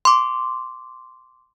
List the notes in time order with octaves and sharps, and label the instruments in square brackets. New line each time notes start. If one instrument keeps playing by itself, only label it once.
[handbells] C6 D6